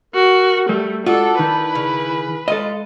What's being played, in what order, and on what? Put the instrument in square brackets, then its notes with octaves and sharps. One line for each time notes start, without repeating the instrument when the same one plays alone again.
[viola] F#4 [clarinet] A#4
[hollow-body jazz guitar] G3 [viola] A3
[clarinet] G#3 [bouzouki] D4 [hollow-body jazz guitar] F4 F#4 [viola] A4
[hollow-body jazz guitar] D#3 [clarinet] E4 [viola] B4
[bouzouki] C#3
[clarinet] G#3 [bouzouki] F4 [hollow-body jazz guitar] A4 D#5